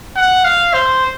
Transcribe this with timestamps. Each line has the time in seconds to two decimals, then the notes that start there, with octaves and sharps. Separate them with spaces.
0.17 F#5
0.45 F5
0.74 C5